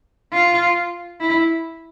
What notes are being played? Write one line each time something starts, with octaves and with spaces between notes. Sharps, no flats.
F4
E4